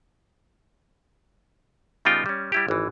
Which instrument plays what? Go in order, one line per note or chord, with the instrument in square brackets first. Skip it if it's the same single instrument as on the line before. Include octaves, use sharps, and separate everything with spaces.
[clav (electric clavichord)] C#3 G3 B3 D#4 F4 G5
G3 C#4
G3 E4 G4
G#1 E3